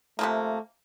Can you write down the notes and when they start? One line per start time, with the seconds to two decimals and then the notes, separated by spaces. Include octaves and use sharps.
0.19 C3 F3 A3 A#3